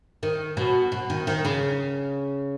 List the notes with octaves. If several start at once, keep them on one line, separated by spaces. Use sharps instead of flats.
D#3
B2
B2
D#3
D#3
C#3